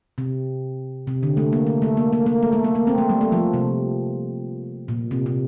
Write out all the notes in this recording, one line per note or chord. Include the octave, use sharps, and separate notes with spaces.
C3
C3
D3
A3
A#3
A3
A3
A#3
A#3
A#3
A3
A3
A#3
A#3
C4
A3
G3
A3
F3
C3
A#2
C3
C3